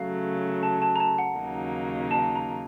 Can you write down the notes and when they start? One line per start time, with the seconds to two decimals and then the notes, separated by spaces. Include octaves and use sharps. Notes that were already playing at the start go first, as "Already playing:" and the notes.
Already playing: C#3 F#3 A3 F5
0.63 A5
0.82 A5
0.96 A#5
1.00 A5
1.18 F#5
1.37 D#2 C#3 F#3 A#3 D#4
2.11 A5
2.35 A#5